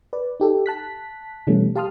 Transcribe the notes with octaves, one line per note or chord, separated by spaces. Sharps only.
B4 D5
D#4 G4 A4
A5 F#6 B6
B2 E3 G3 A3 C#4
G4 F5 A5 C6 D#6 F6